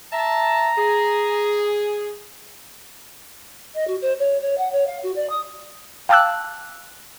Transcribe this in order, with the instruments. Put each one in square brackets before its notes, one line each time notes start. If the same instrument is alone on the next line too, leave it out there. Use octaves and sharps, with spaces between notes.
[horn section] E5 A5 [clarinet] A#5
[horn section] G#4
[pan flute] D#5
F#4
C5
C#5
C#5
F#5
C#5
F5
F#4
D5
D#6
[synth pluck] F5 G5 A5 D6 E6 F#6